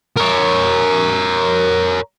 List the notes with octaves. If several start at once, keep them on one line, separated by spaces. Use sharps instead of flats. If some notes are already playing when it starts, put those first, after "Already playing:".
A#4 C#5